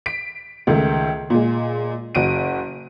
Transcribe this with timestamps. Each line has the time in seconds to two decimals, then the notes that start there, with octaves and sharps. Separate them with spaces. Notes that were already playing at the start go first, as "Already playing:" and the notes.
0.06 B6 D7
0.67 C#2 D#3 A3
1.30 A#2 G#3
2.15 F#1 F#4 D7 D#7